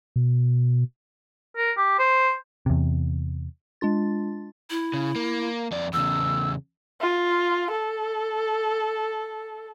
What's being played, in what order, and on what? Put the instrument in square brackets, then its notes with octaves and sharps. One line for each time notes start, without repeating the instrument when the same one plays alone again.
[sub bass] B2
[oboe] A#4
G4
C5
[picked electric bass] E2 C3
[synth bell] G#3 D4 F4 A6
[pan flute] E4
[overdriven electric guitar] C#3
A#3
F2 D5
[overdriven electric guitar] E2 C#3 [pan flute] E6
[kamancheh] F4
A4